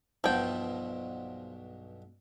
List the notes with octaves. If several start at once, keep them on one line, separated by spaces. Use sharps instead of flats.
B1 G2 B2 F3 G5